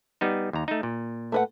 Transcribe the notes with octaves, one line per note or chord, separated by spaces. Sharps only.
G3 B3 D#4
D#2 A#5
A3 D#4
A#2
A3 B4 F#5